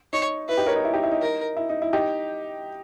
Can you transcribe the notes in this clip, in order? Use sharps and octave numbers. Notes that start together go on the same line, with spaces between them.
D#4 C#5
E4 B4
D#4 G4
A#4 C#5
D#4
E4
D#4 G4
E4
D#4
A#4
E4
D#4
E4
D#4 G4